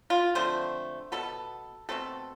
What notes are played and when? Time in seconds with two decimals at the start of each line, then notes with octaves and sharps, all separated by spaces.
0.10 F4
0.35 D3 F3 A3 C4 C5
1.12 B2 B3 A4
1.89 B2 A3 C4 A4